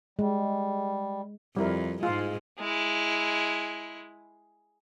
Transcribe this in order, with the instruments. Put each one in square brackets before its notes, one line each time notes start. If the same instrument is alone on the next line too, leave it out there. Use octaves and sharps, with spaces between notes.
[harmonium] G3 [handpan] G#3
[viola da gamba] F2 [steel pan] G3 E4 A#4
[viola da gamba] G#2 G#3 [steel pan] F4
[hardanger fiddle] G#3 E4